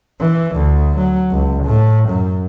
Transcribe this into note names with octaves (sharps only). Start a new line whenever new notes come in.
E3
D2
F#3
C#2
A2
F#2